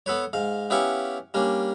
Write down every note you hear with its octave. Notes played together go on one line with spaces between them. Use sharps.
B3 A4 B4 C#5
G#2 F5
B3 C#4 E4 G4 F5 C#6
G3 A#3 C#4 D4